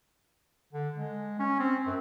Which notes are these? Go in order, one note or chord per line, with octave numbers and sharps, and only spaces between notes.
D3
G#3
C#4
C4
F#2